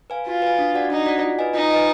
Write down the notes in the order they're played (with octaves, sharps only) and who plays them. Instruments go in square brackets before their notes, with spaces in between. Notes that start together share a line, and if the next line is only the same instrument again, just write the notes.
[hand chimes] B4 F5 G#5
[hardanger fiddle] F4 [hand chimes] F#4
[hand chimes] B4 F5 G#5
D4
F#4 D5 F#5
[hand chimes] D4 [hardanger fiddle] D#4
[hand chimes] F#4 D5 F#5
F4
B4 D#5 G#5
[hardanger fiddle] D#4 [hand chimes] F4
[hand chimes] B4 D#5 G#5